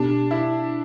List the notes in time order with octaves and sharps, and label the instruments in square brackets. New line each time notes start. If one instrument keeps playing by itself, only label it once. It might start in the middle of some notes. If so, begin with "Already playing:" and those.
Already playing: [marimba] B2 B3 G4 [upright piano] D4
[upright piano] E4